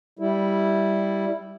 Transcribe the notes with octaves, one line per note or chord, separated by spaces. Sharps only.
G3 E4